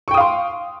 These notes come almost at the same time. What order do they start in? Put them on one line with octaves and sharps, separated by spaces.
C#6 G5 D#6 F5 C6